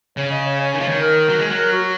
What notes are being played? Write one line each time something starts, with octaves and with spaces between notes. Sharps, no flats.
C#3 C#5
D#5
C#5
C#5
D#3 C#5
F3
D#3 C#5
A#4
F#3
G#3
F#3
A#4
F#4